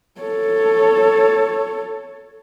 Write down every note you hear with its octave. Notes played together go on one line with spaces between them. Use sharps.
A4 C#5